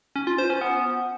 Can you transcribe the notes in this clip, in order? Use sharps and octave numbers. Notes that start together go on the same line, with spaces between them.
C#4
F4
C5
C#4
B3